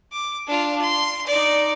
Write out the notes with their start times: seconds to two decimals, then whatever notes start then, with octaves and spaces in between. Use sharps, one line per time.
0.12 D6
0.47 D4 F4
0.82 C6
1.27 D#4 D5